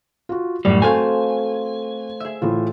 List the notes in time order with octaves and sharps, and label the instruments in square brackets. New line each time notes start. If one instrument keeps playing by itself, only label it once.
[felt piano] F4 F#4
[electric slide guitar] F#2 A2 G3 [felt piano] D5
[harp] A3 C5 F5 [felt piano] C4 F#4 [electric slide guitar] G#5
[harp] G#4 E5
[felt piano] A2 E3 F4